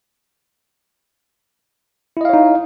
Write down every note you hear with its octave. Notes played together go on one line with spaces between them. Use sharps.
D#4 E4 C#5 D#5 F5